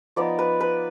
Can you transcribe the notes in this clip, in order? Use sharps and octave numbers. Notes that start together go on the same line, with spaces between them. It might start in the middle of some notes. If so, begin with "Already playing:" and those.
F3 B3 D#4 D5
B4
B4